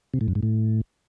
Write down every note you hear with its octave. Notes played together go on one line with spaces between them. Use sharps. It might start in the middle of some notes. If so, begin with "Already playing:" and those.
C3
A2
F#2
G#2
A2